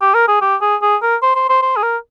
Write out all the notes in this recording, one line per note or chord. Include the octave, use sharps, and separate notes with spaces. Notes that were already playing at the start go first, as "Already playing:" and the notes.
G4
A#4
G#4
G4
G#4
G#4
A#4
C5
C5
C5
C5
G#4
A#4